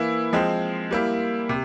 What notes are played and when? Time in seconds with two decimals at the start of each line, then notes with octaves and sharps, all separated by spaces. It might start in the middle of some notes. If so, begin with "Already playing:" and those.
Already playing: E3 A#3 E4
0.33 F3 G#3 C4
0.91 G3 A#3 E4
1.49 C3